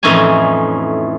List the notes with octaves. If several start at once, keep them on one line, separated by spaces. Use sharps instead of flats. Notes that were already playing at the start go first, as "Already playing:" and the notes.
F2 A2 E3 C#4 D#4 G#5